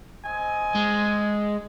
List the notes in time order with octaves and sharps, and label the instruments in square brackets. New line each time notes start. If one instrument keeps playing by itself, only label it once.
[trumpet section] C4 D#5 G#5
[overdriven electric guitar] G#3